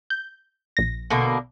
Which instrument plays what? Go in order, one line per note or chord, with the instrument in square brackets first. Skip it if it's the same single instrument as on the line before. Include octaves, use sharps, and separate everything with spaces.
[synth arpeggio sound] G6
A#1 A#6
[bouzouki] B2 D3 A#3